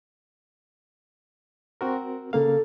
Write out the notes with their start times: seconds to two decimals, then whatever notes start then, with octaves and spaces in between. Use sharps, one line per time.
1.81 C4 F#4 A#4
2.33 C#3 A#3 A4 F5